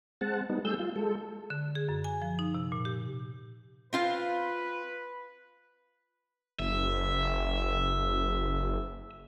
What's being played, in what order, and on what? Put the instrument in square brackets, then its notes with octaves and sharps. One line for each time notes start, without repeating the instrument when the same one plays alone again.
[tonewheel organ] G#3 C4 F#5 A5
G3 B3 D#4
G3 A3 G#4 E6 G6
F4
G#3 A4
[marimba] D3
G#4
F#2
G#5
F3
D#4
C3
A#2
G4
[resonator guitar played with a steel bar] C4 F4 F5 [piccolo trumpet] B4
[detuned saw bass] F#1 [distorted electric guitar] E5